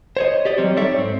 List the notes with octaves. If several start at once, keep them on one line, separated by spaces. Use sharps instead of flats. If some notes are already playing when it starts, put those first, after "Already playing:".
C5 C#5 D#5
G4 D5 D#5
F#3 G3 C4 C#5
G3 D#4 A4 C#5 D5 E5
G#2 C4